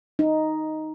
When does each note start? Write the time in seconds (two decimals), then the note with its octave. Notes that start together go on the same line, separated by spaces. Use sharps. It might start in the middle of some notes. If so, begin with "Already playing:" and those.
0.19 D#4